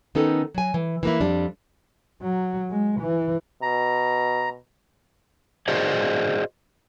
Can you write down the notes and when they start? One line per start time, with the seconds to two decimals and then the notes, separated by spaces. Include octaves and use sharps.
0.15 D#3 B3 C#4 D#4 A4
0.54 F#3 G#5
0.74 E3
1.03 E3 A#3 E4
1.21 F2 G3 D4
2.22 F#3
2.71 G#3
3.01 E3
3.62 B2 A#5
5.68 F#4 G#4 C5 D5 D#5